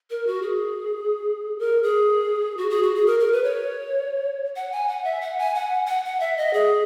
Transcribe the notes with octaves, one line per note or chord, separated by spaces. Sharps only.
A#4
F#4
G#4
A#4
G#4
F#4
G#4
F#4
G#4
A#4
A#4
B4
C#5
F#5
G#5
F#5
E5
F#5
G#5
F#5
F#5
F#5
E5
D#5
G#4